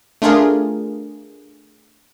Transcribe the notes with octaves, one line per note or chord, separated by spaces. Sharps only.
A3 D4 F4 G#4 A#4